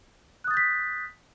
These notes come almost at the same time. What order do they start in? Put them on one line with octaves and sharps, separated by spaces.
F#6 D#6 A6 G6 B6